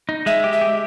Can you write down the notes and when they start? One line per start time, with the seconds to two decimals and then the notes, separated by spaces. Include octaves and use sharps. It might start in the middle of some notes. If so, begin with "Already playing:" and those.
0.09 D#4
0.26 G#3 E5
0.44 G4
0.52 E5
0.61 G4